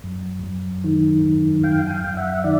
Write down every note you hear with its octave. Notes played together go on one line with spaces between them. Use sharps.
F#2
F#2
D#3
F#2
F#2 F5 G5
G#5
F5 G5
F#2
E5 F#5
D#3 D5 E5